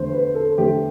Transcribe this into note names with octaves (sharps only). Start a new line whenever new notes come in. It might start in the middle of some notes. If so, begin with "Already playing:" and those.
Already playing: E2 D3 A3 C5
B4
A4
E2 D3 A3 G4